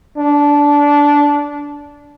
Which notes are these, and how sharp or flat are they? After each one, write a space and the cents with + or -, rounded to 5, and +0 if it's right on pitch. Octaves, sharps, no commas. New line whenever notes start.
D4 -15